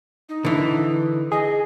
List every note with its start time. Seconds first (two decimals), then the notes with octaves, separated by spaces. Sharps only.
0.29 D#4
0.45 D3 E3
1.32 G#4 D#5